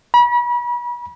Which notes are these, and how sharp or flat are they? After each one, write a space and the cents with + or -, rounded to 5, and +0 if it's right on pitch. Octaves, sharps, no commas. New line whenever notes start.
B5 -35